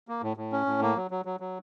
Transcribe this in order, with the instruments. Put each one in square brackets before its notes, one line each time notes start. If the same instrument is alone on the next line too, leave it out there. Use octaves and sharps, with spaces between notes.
[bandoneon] A#3
A2
A2
C#4
A2
A#3
F#3
F#3
F#3
F#3